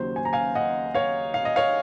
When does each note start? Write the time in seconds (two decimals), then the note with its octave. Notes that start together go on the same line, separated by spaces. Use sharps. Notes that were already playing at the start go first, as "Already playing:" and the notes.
Already playing: D#2 C#3 F#3 C5
0.16 G#5
0.25 A#5
0.33 F5 G#5
0.55 D#5 F#5
0.95 C#5 F5
1.34 F5
1.45 D#5
1.56 C#5 F5